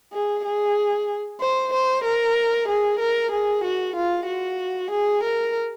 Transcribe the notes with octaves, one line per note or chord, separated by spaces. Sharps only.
G#4
G#4
C5
C5
A#4
G#4
A#4
G#4
F#4
F4
F#4
G#4
A#4